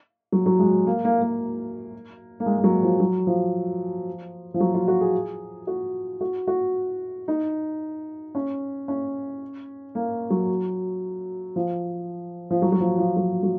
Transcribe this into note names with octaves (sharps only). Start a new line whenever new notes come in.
F#3
F#3
G#3
A#3
A#3
A#3
A#3
G#3
G#3
F#3
F3
F#3
F3
F3
F#3
F4
F#4
G#4
F#4
F#4
F#4
D#4
C#4
C#4
A#3
F#3
F3
F3
F#3
F#3
F3
F3
F#3
F#3